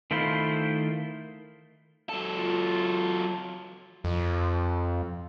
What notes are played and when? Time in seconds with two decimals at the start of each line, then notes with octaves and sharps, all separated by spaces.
0.11 D#3 A3 E4 F4 C5
2.09 F#3 A4
2.38 F4
4.04 F2